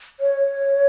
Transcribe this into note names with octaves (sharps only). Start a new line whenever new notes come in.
C#5